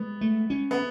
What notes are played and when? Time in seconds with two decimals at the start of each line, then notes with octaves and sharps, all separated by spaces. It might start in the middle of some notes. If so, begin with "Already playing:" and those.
Already playing: G#3 B3
0.21 A3
0.50 C#4
0.71 B3